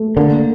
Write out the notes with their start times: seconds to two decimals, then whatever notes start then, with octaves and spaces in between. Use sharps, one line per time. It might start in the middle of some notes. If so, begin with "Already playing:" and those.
Already playing: A3
0.16 D3 A#3